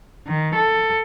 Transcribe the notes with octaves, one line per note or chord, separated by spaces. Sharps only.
D#3
A4